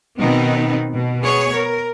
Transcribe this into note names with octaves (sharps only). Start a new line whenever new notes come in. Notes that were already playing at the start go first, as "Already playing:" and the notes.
B2 D#3 B3 C4 D#4
B2
B3 G#4 C#5
A#4